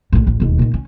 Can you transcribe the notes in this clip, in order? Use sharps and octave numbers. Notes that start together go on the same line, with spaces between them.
A#1 A2
A1
E1 D#2
A#2 D#3
C#4